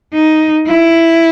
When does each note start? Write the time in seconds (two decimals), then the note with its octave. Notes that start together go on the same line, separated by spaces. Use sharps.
0.14 D#4
0.68 E4